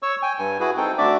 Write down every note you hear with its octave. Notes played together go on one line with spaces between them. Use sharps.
C#5 C#6 E6
G5 G#5
G2 G#5
E4 F#4 G#4 B4 G#5
C4 D#4 A4 G5
D2 D4 F#4 D5 E5 D6